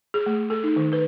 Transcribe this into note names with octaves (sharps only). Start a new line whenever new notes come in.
G#4
A3
A4
D#4
D#3
B4